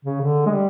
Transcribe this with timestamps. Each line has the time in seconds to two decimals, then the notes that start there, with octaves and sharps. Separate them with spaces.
0.05 C#3
0.21 D3
0.46 G#3
0.51 G3